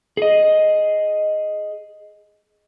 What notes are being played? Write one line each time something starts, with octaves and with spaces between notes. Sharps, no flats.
G#4 D#5